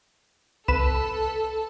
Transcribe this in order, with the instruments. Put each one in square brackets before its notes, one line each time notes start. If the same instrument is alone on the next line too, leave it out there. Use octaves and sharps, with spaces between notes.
[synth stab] C2 B4 E7 [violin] A4